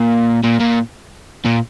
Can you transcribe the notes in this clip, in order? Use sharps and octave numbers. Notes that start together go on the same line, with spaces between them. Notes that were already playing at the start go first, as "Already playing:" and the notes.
Already playing: A#2
A#2
A#2
A#2